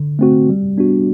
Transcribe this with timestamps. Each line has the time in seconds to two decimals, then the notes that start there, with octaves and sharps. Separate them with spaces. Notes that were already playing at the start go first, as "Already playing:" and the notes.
Already playing: D3
0.19 A3 C4 F#4
0.49 G3
0.78 B3 D4 F#4